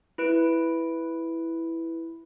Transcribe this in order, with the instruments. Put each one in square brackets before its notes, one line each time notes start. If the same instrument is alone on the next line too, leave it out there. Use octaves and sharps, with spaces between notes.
[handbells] E4 B4 D7